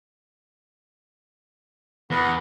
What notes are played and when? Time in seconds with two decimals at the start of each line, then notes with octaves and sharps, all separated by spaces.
2.11 E2 B3 B4 F#5